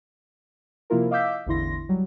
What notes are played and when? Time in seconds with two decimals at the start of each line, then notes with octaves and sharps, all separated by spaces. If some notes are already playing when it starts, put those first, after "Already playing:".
0.90 C3 F3 A#3 E4 F4 A#4
1.11 D#5 F5 D6 E6 G6 B6
1.46 A1 E2 D3 E4 C6 A#6
1.89 F#3 G3